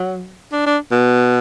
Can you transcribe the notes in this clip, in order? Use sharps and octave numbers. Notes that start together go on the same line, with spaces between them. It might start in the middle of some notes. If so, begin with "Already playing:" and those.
Already playing: F#3
D4
D4
B2